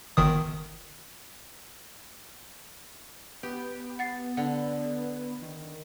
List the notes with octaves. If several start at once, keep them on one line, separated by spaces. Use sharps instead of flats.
G1 D#3 D#6
B3 G4
F#5 A6 C7
D3 F#5
D#3